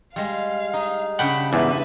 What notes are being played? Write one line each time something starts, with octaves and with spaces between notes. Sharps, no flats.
G3 G#3 F5
D#4
C#3 D4 G4 F#5 G5 B5
E2 G#2 B4 E5